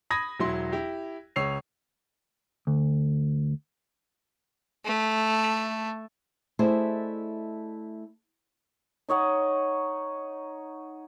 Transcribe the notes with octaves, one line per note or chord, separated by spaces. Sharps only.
B5 D#6 G#6 A#6
E1 F#3 E4 C6
E4 G4
C#2 C#5 E6 C7 F7
D2
A3
A3 E4 G#4 C5 D5 D#5
D#4 C#5 D#5 F#5